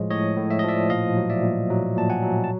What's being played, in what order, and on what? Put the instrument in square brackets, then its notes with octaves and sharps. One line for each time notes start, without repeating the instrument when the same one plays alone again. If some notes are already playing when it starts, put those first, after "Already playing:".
Already playing: [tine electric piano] A2 F3 G#3 C#5 D#5
A2 C#5 D#5
A2
E5
D#5
F3 D5 E5
A#2 D#5 F5
F#3
D5 E5
A#2
F#3
A#2 A5
F#5 G#5
F#3
A5